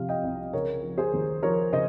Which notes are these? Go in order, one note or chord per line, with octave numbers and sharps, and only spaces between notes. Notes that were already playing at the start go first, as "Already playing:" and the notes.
Already playing: C3 F3 F5
D#5 G5
C2
C#3 A#4 C#5
F3
G#4 C5
D#2
F3 A#4 C#5
C#3 C5 D#5